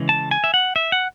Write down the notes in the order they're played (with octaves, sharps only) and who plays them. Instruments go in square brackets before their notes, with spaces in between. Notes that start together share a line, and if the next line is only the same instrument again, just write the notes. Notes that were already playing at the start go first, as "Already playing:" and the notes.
Already playing: [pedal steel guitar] C#3 E3 G#3
A5
G#5
E5
F#5
E5
F#5